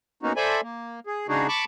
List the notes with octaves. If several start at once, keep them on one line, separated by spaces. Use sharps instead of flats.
A#3 B3 C#4 D#4 F#4
A4 C5 D5 E5 G#5 B5
A#3
G#4
C#3 G#3 D4 D#4 F#4 G#4
A5 B5 C#6 D6